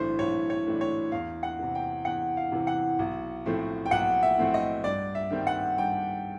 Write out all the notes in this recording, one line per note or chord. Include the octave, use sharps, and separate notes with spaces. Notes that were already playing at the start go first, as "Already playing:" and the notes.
Already playing: B1 A2 E3 A3 D4 C5
B1 C#5
C#5
A2 E3 A3 D4
C#5
E2 F5
F#5
C3 E3
G5
E2 F#5
F5
C3 E3
F#5
B1
A2 F3 A3 C4
G5
B1 F#5
E5
A2 F3 A3 C4
D#5
G2 D5
E5
D#3 G3 C4
F#5
G2 G5